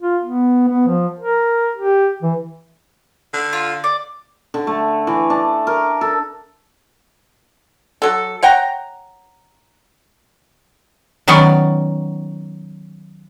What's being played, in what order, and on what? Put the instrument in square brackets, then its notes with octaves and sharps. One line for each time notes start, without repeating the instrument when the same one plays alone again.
[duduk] F4
B3
B3
F3
A#4
G4
E3
[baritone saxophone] D3
[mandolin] F4
D5
[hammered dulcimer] D3
A3
E3
D4
A#4
A4
[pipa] F#3 A4
C#5 F#5 G5 A#5
[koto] D#3 F#3 B3 C#4 D5